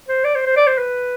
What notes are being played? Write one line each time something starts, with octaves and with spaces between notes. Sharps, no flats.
C5
D5
C5
C5
D5
C5
B4